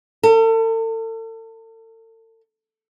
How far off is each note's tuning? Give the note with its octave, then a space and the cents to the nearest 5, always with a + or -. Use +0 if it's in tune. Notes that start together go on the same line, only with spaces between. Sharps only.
A4 +40